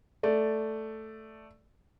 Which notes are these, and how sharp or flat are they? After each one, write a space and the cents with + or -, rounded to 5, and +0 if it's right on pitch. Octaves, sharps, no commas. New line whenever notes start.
A3 +0 D5 +0